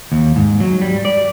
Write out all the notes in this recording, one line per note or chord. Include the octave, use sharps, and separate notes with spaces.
D#2
G#2
F#3
G3
D5